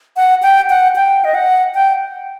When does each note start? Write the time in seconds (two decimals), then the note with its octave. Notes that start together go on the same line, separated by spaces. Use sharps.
0.16 F#5
0.43 G5
0.70 F#5
0.96 G5
1.24 D#5
1.34 F#5
1.74 G5